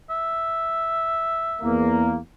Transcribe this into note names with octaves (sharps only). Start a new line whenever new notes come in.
E5
E2 A#3